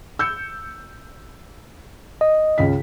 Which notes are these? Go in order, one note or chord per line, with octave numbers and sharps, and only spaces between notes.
E6 G6 C#7
D#5
C#2 C#3 B6